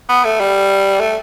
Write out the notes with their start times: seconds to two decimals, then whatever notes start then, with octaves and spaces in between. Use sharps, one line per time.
0.09 B3
0.24 A3
0.40 G3
1.00 A3